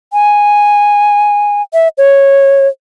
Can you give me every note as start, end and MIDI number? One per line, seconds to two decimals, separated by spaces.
0.13 1.62 80
1.73 1.88 76
1.98 2.68 73